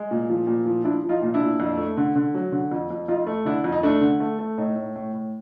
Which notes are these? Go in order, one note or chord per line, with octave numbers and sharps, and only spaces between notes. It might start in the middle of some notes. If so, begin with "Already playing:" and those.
Already playing: G#3
A#2
F3
A#2
F3
F3 D4 E4
F3
D#4 F4
A#2
D4 E4
A#2
F2
A3
D3
D3
F#3
D3
F2
F2
F2 D#4 F4
A3
D3 D4 E4
F2
D#4
A3 D4
D3
A3
A3
A2 D#4
A2
A2
A2